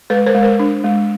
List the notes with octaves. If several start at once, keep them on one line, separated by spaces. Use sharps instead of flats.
G#3 A4 B4
A#4 C5
G#3
A#4 C5
D4
G#3